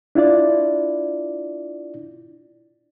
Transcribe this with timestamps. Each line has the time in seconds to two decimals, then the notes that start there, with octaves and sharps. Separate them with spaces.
0.15 D4 E4 F4 D5